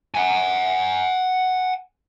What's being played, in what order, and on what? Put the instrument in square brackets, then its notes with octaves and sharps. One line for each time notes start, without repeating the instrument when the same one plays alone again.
[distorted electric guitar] F#5 G#5